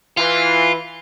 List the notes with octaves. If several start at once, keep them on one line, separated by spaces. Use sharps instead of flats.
E3 F4